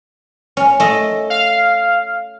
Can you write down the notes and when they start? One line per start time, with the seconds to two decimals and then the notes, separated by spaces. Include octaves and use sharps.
0.57 C#4
0.80 A3 D#5
1.30 F5